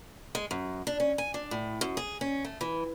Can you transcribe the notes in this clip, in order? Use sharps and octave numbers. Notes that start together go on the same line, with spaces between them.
G#3
F#2
D4
C#4
G#5
D4
A2
F#2
G#4
C#4
A3
E3